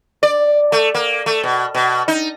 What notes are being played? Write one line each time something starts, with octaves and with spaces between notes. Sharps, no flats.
D5
A3
A#3
A3
B2
B2
D#4